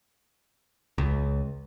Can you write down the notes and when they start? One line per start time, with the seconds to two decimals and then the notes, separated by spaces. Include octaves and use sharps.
0.98 C#2